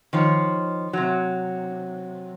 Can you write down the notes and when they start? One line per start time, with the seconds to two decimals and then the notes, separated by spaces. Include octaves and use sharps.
0.13 D#3 F3 C#5
0.93 C3 F#3